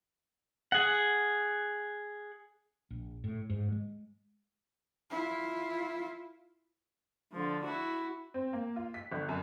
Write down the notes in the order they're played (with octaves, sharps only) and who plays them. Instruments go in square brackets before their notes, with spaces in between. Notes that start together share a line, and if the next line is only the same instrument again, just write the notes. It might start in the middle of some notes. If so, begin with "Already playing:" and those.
[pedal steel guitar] G#4 F#5
[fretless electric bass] A#1
A2
G#2
G#3
[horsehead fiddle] E4 F4
[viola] D3 F3
E4 F#4
[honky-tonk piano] C4
A#3
F4
B6
G1
F#2